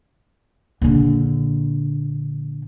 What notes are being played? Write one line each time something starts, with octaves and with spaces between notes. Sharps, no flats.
A#1 D3